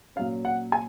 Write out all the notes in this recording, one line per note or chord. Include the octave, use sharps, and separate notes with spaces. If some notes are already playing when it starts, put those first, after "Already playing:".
A#2 F#3 C#4 F5
F#5
G#5